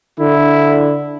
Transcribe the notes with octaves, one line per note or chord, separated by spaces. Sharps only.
D3 E4